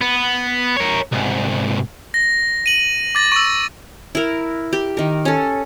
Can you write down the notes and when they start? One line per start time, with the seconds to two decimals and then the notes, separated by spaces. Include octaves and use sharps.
0.02 B3
0.77 A#4 C#5
1.13 C2 G#2
2.14 A#6
2.66 D#7 F#7
3.15 D6 A6 A#6
3.32 C#6 E6
4.15 E4 A#4
4.73 G4
4.97 D#3 A#4
5.25 C#4 A4